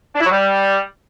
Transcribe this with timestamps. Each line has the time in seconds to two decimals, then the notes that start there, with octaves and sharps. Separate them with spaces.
0.15 D4
0.20 E4
0.26 F#3
0.31 G3